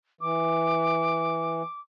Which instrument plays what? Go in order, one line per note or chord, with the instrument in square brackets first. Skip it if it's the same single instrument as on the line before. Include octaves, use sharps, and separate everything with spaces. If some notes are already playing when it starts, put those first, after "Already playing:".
[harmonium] E3 [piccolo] D6